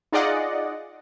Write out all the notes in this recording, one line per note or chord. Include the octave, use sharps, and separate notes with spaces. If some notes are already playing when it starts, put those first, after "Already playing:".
D#4 F4 G#4 D5 D#5 F#5